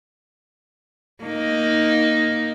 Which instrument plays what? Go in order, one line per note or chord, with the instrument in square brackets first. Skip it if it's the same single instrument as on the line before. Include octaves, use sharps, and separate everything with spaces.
[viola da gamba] A#3 D#4